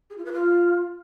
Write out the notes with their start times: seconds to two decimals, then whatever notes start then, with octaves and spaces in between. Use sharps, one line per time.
0.10 G#4
0.18 F4
0.25 B4
0.33 F4